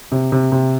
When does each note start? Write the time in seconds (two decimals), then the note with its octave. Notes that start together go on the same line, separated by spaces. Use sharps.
0.12 C3
0.32 C3
0.52 C3